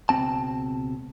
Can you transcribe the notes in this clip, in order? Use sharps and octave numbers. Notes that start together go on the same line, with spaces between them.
C#2 B2 C4 A5